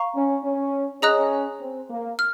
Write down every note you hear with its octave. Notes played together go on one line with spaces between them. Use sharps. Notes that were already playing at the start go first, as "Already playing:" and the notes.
Already playing: F5 A#5 C#6
C#4
C#4
C#4 G#4 D#5 A#5 D#6 F#6
C4
A#3
F6